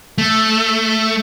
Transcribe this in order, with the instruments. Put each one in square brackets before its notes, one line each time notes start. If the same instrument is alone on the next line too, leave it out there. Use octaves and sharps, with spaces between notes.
[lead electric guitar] A3